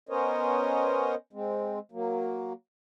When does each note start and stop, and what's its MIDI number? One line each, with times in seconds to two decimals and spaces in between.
0.09 1.15 59
0.09 1.15 61
0.09 1.15 70
0.09 1.15 72
0.09 1.15 73
0.09 1.15 75
1.33 1.79 56
1.33 1.79 60
1.92 2.53 54
1.92 2.53 58